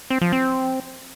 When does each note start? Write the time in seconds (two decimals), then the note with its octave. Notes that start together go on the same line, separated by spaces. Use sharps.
0.10 C4
0.22 F3
0.33 C4